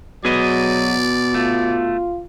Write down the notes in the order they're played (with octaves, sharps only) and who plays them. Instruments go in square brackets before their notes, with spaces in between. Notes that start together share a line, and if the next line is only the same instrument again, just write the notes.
[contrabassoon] B2 [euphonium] F#3 [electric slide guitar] G#4 B4 D#5 [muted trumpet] D5
[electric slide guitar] A3 [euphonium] F4